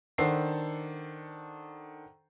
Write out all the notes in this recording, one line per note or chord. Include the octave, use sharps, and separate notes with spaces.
D#3 D4 A4 C5 F#5 C7